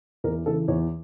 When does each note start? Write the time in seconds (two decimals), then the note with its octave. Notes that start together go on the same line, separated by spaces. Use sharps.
0.24 E2 A#4
0.46 C#3 E3 A4
0.68 E2 C#5